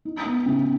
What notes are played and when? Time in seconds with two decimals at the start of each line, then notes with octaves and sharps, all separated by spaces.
0.05 D#4
0.25 B3
0.46 C#3